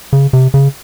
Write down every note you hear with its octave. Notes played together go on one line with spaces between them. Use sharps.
C#3
C3
C#3